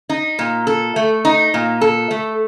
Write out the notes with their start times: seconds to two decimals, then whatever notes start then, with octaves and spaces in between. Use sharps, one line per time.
0.09 D#4
0.39 A#2
0.67 A4
0.96 A3
1.25 D#4
1.54 A#2
1.81 A4
2.11 A3